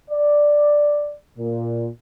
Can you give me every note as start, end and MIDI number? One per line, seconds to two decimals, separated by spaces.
0.10 1.13 74
1.38 1.87 46